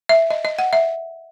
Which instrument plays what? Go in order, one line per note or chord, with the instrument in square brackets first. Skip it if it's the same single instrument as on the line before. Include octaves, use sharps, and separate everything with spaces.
[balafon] E5
D#5
D#5
F#5
E5